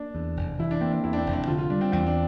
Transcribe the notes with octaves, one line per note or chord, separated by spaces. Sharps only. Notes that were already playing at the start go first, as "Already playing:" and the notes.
Already playing: A#3 D4
E2
F1
E3 E4
D4
A#3 C4
D4
E2 E4
D4
C4
F1
D4
D3 F4
F4
G3 D4
C4
E2 C4
D4